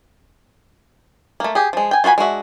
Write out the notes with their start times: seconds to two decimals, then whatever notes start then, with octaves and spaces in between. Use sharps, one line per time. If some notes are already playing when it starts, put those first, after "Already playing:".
1.40 A3 A#3
1.55 G4 G#4
1.73 F3 G#3
1.91 G5 G#5
2.04 F4 F#4 B4 G#5 B5
2.18 G#3 D4 F#4 E5